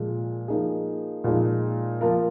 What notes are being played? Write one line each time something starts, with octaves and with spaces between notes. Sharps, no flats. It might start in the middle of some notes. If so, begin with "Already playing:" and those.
Already playing: A#2 F3 G#3
F3 A#3 D#4 G#4
A#2 F3 G#3 D#4
F3 A#3 F4 A#4